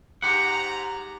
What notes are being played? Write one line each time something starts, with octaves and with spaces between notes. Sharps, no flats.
G#2 G4 F#5 A#5